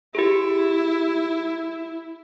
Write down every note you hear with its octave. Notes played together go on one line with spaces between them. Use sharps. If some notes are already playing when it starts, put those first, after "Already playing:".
E4 G4 G#4